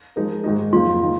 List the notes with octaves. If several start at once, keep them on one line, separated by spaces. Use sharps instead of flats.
F3 G#3 D#4 A#4
G#2 D#3 G#3 D#4
F2 C#3 F#3 A#3 D#4 F4
D#3 A#3